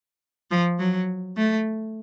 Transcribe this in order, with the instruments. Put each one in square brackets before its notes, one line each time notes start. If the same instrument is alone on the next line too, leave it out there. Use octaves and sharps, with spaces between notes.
[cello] F3
F#3
A3